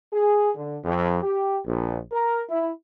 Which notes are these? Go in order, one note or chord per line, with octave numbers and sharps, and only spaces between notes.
G#4
D3
F2
G4
A#1
A#4
E4